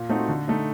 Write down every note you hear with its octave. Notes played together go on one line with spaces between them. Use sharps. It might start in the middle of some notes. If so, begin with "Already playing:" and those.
Already playing: A#2
A3 C4 D#4 F#4
D3
A3 D#4